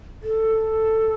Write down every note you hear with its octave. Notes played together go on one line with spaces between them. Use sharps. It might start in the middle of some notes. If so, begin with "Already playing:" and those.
A4